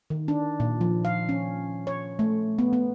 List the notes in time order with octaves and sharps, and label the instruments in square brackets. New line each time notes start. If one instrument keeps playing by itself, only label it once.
[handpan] D#3
D4
A#2
F3
F5
C#4
C#5
A3
B3
B3